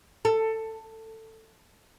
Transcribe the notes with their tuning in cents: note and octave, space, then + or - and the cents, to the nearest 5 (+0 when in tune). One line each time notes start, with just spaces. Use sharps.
A4 +15